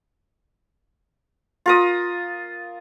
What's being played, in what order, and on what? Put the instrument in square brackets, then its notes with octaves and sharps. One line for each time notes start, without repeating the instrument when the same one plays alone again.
[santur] F4 A#4 D#6